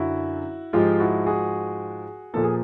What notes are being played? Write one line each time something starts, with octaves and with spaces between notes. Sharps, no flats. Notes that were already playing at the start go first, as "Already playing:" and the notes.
Already playing: F#2 D3 F#3 E4 F#4
G#2 F3 G#3 F4 G4
E4 F#4
F#4 G#4
A#2 F3 A#3 A4
G#4